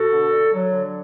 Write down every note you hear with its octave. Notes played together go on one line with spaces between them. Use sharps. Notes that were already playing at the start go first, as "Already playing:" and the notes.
Already playing: B2 F#4 A4
D3
D3
F#3
D3